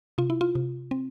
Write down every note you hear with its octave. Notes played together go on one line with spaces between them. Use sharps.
C3 F4
E4
F4
C3
C4